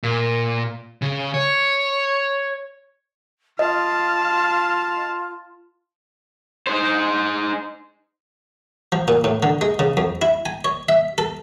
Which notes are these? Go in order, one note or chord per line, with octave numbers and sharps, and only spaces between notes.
A#2
C#3
C#5
F4 D#5 F5 A5
D#4 C5
F3
A#2
A2
D3
G#3
C#3
F2
E4
G#5
C#5
E5
A4